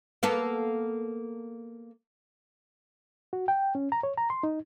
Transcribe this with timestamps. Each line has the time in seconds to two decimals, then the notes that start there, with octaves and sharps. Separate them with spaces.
0.23 A#3 B3 A4
3.33 F#4
3.48 G5
3.75 C#4
3.92 A#5
4.03 C#5
4.18 A#5
4.30 C6
4.43 D#4